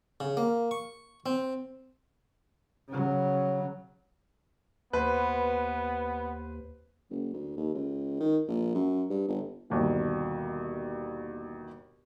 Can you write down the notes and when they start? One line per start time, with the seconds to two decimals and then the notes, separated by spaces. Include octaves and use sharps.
0.20 C#3
0.37 A#3
0.71 C#6
1.26 C4
2.89 C#3 F#3
4.93 D#2 B3 B4 C5
7.11 F#1
7.33 D2
7.57 D#2
7.74 C#2
8.20 D#3
8.47 A#1
8.75 F#2
9.10 G2
9.28 G1
9.70 G1 D#2 B2